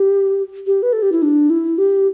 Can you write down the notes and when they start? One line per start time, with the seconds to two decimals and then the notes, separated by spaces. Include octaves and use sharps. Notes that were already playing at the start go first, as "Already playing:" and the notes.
Already playing: G4
0.67 G4
0.83 B4
0.93 A4
1.02 G4
1.12 E4
1.22 D4
1.50 E4
1.78 G4